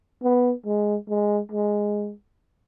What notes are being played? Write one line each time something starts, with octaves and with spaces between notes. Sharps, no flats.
B3
G#3
G#3
G#3